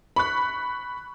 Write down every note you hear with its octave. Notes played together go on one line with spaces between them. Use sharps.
B5 C#6 F#6